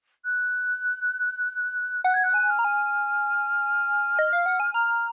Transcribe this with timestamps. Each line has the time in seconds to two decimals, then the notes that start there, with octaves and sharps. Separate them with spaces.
0.24 F#6
2.04 F#5 F#6
2.14 G#6
2.23 F#6
2.34 G#5
2.49 F6
2.59 A#5
2.64 G#5
4.19 D#5
4.33 F5
4.46 F#5
4.60 G#5
4.74 A#5 F6